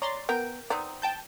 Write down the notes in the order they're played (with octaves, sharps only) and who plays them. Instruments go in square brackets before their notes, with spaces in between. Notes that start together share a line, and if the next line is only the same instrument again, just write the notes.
[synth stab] C#5 C6 A6 [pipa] D5 A#5
[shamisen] B3 [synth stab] A#4 [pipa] G5
[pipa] B3 C4 D#4 [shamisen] D5 A#5
[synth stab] G5 A5 G6